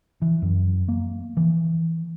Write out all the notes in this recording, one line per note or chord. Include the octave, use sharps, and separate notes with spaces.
E3
F#2
A#3
E3